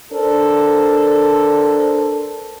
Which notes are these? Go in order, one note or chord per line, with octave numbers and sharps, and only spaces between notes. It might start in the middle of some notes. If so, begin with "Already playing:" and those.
D4 A4 A#4 C5